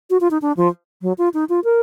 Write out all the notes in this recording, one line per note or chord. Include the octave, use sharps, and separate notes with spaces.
F#4
F4
D#4
D4
F3
F#3
F4
D#4
F4
A#4